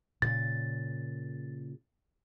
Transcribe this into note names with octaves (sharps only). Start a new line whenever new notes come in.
A#2 C#3 A6